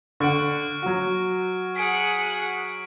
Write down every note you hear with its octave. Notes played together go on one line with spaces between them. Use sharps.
D3 F#5 C#6 F6 D7
F#3 F#4
G#4 F#5 B6 D7